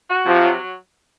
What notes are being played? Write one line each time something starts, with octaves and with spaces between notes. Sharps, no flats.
F#4
C3 F3
F#3